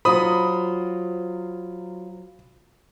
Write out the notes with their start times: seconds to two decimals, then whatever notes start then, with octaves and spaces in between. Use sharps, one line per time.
0.05 F#3 F4 C5 B5 D#6